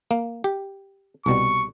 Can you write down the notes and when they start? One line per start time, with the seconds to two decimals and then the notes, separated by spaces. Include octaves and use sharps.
0.11 A#3
0.44 G4
1.26 C2 B2 G3 C#6